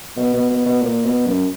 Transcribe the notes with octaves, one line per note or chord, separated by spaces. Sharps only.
B2
B2
B2
B2
A#2
B2
F#2